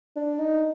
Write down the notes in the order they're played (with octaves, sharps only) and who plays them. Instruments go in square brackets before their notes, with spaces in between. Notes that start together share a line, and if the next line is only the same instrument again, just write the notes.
[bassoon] D4
D#4